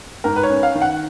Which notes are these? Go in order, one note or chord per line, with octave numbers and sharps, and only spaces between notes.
G#2 A#4
B4
C#5
C#4
F5
D#3
F#5